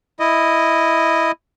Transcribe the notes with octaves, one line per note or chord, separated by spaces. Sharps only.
E4 D#5